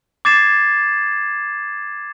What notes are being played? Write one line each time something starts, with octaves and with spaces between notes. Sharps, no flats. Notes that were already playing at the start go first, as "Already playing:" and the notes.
D6 G#6 A6 C7 E7